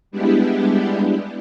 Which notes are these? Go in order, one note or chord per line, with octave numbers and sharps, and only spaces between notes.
G3 G#3 B3 D4 E4 G4